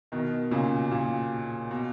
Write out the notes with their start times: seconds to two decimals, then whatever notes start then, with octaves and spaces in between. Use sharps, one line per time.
0.12 B2 D#3
0.51 A#2 C#3
0.91 A#2
1.71 B2